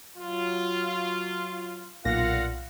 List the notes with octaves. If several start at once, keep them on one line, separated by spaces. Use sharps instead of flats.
F#3 F4
B1 A#2 F4 F5 F#5 A#6